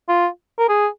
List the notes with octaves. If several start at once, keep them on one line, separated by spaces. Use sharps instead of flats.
F4
A#4
G#4